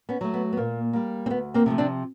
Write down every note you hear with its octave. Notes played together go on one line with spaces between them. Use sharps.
B3 C#4
F#3 A3
B3
B3
A#2 A#3
G3 A#3
C4
D2 B3
A#3 C4
C3 F3 A3
C4 D4